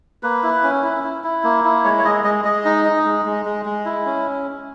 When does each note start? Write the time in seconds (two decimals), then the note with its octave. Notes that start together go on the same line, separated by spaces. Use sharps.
0.23 A#3 B4
0.43 E4
0.63 C#4
0.83 E4
1.04 E4
1.24 E4
1.44 A#3
1.64 E4
1.84 G#3 C#5
1.98 C#5
2.04 G#3 D#5
2.24 G#3 D#5
2.45 G#3 D#5
2.65 D#4
2.85 D#4
3.05 G#3
3.25 G#3
3.45 G#3
3.66 G#3
3.85 E4
4.06 C#4